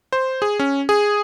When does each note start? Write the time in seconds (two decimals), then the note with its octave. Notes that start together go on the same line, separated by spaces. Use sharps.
0.12 C5
0.42 G#4
0.59 C#4
0.89 G#4